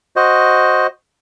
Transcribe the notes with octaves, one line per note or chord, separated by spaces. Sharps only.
F#4 C5 D#5